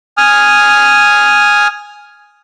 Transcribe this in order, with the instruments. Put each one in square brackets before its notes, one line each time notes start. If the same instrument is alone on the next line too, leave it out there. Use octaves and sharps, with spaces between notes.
[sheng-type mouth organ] G#5 D#6 F6